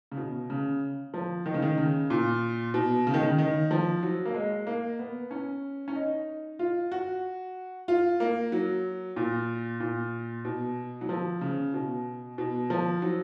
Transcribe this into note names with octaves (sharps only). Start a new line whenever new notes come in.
C#3
B2
C#3
F3
D#3
C#3
D#3
C#3
A#2
B2
C#3
D#3
C#3
D#3
F3
F#3
A#3
G#3
A#3
B3
C#4
C#4
D#4
F4
F#4
F4
A#3
F#3
A#2
A#2
B2
F#3
F3
C#3
B2
B2
F3
F#3